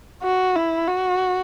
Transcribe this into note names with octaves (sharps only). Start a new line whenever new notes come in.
F#4
E4
F#4